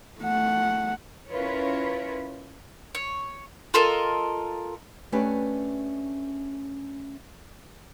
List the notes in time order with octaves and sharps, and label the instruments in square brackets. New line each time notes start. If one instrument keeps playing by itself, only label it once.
[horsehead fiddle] A3 F#5
[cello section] C#4 E4 F4 A#4 B4 C#5
[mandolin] C#5
F4 A4 A#4 D#5
[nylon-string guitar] A3 C#4 D4 G4 B4